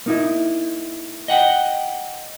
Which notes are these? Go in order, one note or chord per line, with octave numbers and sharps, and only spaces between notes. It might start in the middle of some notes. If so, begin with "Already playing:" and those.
A#3 D#4 E4
D#5 F#5 G5